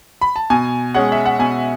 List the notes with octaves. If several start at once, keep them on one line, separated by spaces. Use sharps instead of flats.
B5
A5
B2 G#5
G#3 C#4 F#5
E5
F#5
B2 G#5